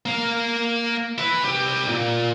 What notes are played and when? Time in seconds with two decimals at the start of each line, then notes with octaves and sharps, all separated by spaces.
0.06 A#3 F5
1.18 E4 B4
1.43 C2 G4
1.88 A#2